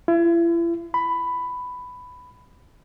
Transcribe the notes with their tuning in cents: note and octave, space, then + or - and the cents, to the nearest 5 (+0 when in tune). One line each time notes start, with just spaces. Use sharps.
E4 +40
B5 +10